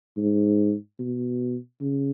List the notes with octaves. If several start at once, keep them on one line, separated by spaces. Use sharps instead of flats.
G#2
B2
C#3